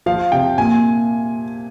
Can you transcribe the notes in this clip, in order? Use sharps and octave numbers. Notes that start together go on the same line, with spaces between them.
F3 F5
C3 G5
A#2 G#5